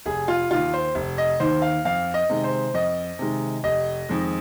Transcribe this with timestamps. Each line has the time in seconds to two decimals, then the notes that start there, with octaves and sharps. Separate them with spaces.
0.06 F1 G#4
0.28 F4
0.51 D#2 D#3 F4
0.74 C5
0.95 F1
1.18 D#5
1.40 D#2 D#3 C5
1.62 F5
1.85 F2 F5
2.14 D#5
2.30 C3 D#3 G#3
2.44 C5
2.74 F2 D#5
3.19 C3 D#3 G#3
3.64 F1 D#5
4.09 F2 D#3 G#3